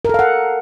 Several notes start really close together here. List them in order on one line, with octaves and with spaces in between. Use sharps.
A#4 A4 F5 F#5